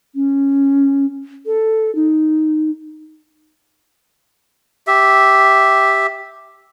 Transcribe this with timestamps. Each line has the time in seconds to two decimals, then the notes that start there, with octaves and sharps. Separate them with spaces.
0.15 C#4
1.46 A4
1.95 D#4
4.87 G4 E5